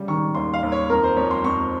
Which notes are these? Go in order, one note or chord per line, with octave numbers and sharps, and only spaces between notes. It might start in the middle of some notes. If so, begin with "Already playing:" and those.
Already playing: C#3 G3
D#3 C#6
D#2 C6
F5
D#2
C#5
F2 A#4
C5
F2 C#5
C6
F2 C#6